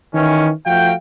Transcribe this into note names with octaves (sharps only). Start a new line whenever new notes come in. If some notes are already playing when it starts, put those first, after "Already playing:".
D#3 E3 C#4
F3 A3 F#4 F5 G5